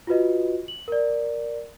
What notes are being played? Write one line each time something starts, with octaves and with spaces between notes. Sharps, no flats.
F4 F#4 B4 D#5
F#7
A#4 D5